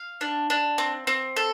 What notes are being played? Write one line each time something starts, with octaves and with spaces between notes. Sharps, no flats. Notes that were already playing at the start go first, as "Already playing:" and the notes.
Already playing: F5
D4
D4
C4
C4
A4